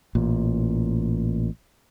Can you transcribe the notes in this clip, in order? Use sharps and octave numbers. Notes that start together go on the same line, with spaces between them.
A1 A#2